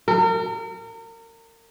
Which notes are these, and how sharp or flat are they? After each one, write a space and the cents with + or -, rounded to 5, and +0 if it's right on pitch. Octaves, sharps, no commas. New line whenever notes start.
A#4 -35